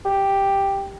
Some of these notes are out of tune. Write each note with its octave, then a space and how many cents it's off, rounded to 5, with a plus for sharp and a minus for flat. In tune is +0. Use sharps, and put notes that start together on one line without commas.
G4 +5